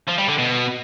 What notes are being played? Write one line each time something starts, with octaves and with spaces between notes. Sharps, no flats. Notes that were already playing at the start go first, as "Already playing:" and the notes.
F3
G3
D3
B2